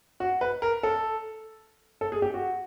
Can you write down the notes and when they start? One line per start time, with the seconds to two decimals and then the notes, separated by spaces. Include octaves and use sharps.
0.20 F#4
0.41 B4
0.62 A#4
0.83 A4
2.01 A4
2.12 G#4
2.22 G4
2.34 F#4